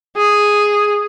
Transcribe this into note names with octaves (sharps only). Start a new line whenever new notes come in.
G#4